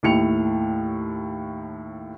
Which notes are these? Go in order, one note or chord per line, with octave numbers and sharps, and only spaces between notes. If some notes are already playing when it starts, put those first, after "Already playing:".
D#2 A2 C#7 F7